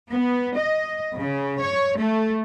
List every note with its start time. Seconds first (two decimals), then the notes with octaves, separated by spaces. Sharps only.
0.12 B3
0.58 D#5
1.17 C#3
1.61 C#5
1.98 A3